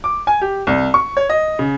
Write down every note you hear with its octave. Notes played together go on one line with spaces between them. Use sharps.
D6
G#5
G4
C2
C#6
C#5
D#5
C#3